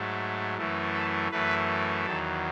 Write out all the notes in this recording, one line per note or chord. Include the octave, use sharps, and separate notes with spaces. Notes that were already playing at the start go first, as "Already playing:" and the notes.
Already playing: G#2 F#3 A3
F#2 E3 A3
A4
F#2 E3 A3 B4
E2 D#3 F#3 A4